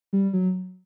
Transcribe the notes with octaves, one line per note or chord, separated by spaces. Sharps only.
G3
F#3